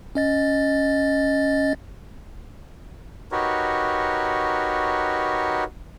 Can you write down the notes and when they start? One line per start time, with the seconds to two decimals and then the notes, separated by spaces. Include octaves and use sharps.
0.15 C#4 D#5 A6
3.32 D#4 F#4 G4 A#4 B4 C#5